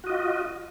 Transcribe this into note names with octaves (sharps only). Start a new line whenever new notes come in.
F4 F#4 D#5